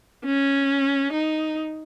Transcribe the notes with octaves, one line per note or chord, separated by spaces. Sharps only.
C#4
D#4